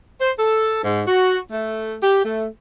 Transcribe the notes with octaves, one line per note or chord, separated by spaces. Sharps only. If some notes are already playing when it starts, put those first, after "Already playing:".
C5
A4
G#2
F#4
A3
G4
A3